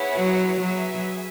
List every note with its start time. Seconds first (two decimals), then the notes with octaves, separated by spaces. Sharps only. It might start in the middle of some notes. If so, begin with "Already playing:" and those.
Already playing: B3 E4 G#4 C#5 F#5
0.17 F#3
0.61 F#3 G#4 B4 E5 G#5